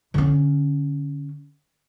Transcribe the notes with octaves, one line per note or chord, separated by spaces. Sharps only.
D3 C#4